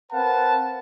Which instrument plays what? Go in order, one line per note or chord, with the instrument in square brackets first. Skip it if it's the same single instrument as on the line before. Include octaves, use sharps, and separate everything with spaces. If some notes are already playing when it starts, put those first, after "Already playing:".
[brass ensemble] C4 A#4 B4 F5 F#5 A5